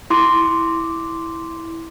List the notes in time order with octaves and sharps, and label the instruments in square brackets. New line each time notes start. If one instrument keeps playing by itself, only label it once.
[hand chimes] E4 C6 D6